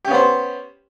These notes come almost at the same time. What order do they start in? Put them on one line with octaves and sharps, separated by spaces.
G4 C#4 B3 C5